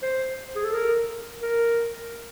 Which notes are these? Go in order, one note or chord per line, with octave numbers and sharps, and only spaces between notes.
C5
G#4
A4
A#4
A#4